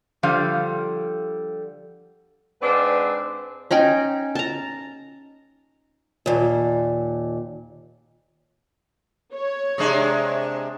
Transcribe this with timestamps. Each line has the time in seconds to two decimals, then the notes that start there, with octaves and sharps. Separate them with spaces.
0.23 D3 F3 G3 F5
2.62 G#2 C4 D4 B4
3.71 C#4 D#4 G5 G#5
4.35 A5 A#5
6.26 D#2 A#2
9.34 C#5
9.78 C3 G#3 D4